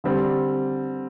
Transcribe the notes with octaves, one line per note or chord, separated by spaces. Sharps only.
D3 G3 C4